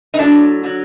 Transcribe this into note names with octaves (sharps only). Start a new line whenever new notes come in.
D#4
A2 F#3 D4
D3 F#3